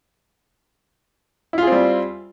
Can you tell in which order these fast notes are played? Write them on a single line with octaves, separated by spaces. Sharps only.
E4 F4 G#4 C4 G3